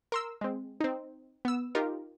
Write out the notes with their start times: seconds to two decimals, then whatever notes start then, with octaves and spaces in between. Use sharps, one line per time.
0.12 A#4 C6 E6
0.41 G#3 C4
0.81 C4 D#4
1.45 B3 E6
1.75 D#4 F4 G4 A#4